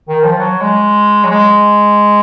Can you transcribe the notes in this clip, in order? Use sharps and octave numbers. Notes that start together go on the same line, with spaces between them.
D#3
F3
F#3
G#3
F#3
G#3